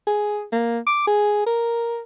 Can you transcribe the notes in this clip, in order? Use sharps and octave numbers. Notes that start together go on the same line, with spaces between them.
G#4
A#3
D6
G#4
A#4